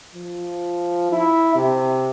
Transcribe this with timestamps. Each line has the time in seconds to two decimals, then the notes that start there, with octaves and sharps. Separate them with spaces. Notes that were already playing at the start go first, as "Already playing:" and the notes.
0.15 F3
1.12 E4
1.55 C3